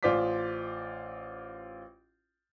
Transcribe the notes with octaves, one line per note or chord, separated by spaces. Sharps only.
A1 F4 C5 D5 D6 B6